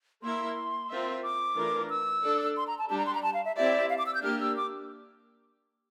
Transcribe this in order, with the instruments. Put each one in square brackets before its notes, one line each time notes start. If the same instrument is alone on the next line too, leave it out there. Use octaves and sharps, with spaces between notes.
[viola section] A#3 E4 A#4 E5 [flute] C6
[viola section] C4 F4 A#4 E5
[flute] D6
[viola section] E3 A3 D4 F4 A#4
[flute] E6
[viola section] D4 A4 D5
[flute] C6
A#5
A5
[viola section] G3 D4 G4 [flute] A5
[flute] A#5
C6
A#5
A5
F5
E5
[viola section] C4 E4 G4 D5 [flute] E5
[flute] F5
D6
E6
G6
[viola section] A#3 D4 G4 [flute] F6
[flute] E6
D6